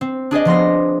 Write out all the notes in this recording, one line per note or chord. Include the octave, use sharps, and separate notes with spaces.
C4
D4 G#4 D5 D#5
F3 B3 C6 A#6